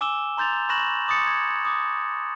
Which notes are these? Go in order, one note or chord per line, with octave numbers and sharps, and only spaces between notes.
G#5 D6 E6 E7 G7
A#5 C6 G6 A6 F7
B5 C#6 F#6 A#6 E7 F#7
C6 D6 D#6 A6 C#7
G#6
D6 D#6